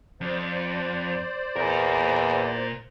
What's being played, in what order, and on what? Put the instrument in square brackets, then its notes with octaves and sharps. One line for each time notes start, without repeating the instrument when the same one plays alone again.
[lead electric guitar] F2 [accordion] C5 D5
[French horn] E2 [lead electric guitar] A#2 A#4